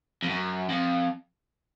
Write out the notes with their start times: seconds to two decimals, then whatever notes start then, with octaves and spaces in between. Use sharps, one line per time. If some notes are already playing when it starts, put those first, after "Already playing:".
0.22 F2
0.29 F#2
0.70 F2